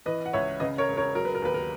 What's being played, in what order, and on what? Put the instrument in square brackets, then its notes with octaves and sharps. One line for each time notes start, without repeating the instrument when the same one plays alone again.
[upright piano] E3 B4 D#5
F#5
C#2 C#5 E5
C#3 B4 D#5
A#4 C#5
E1
A#4 C#5
F#3 A#4
B4
A#4
D#2 B4
A#4